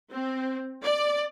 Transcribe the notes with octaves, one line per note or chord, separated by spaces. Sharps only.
C4
D5